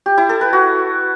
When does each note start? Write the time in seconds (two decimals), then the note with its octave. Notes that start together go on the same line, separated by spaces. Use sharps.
0.06 G4
0.18 E4
0.29 A4
0.41 B4
0.53 F#4